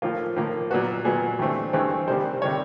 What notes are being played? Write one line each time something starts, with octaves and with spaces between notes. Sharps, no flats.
A2 F3 A#3 F4
A2 F3 A#3
A#2 F#3 B3 F#4
A#2 F#3 B3 G#4
G2 E3 A3 C4
G2 E3 A3 C4 G#4
C3 D#3 G3 C5
C3 D#3 G3 C#5